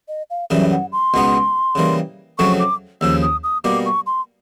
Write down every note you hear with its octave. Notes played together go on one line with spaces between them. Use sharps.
D#5
F5
F#2 C#3 E3 G3 E5
F#5
C6
C#2 B2 G#3 B3 D#4
C#3 E3 G3 A#3
F2 C#3 F#3 A3 C4 C#6
D6
D#2 C#3 F3 E6
D#6
D#6
B2 G3 A#3 D6
C#6
C6